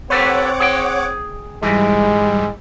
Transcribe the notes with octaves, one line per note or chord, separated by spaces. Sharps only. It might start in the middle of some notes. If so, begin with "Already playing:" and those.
C4 G4 A4 B4 C#5 F#5 D6
G#4 G5
G#2 E3 G3 G#3